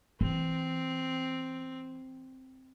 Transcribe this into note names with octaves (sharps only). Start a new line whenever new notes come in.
E3 C4